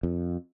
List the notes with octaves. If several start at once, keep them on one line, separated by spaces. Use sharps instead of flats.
F2